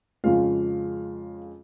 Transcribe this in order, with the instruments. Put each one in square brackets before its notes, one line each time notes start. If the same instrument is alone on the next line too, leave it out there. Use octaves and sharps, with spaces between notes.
[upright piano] F2 C#3 G#3 C#4 F4 F5